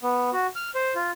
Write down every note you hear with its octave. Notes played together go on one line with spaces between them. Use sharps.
B3
F#4
F6
C5
F4